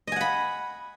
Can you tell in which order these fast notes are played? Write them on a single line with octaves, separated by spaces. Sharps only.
D#5 G#5 F#5 B5